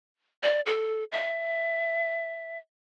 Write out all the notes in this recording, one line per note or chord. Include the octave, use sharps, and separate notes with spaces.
D5
A4
E5